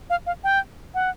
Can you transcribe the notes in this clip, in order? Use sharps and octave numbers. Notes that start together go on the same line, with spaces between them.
F5
F5
G5
F#5